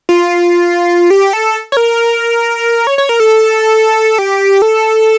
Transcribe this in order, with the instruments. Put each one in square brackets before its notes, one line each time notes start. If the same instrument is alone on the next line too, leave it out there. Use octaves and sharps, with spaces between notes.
[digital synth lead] F4
G4
A4
C#5
A#4
C#5
C#5
A#4
A4
G4
A4